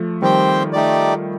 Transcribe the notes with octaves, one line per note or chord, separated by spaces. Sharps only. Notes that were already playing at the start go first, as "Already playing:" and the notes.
Already playing: F3 A3
D#3 G3 C4 G4 C5 G5
A3 D#4 G4 D5